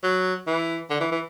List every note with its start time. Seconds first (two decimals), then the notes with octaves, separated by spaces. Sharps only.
0.03 F#3
0.47 E3
0.90 D3
1.00 E3
1.12 E3